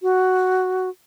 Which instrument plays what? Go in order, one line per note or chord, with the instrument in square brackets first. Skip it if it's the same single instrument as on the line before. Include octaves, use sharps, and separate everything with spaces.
[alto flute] F#4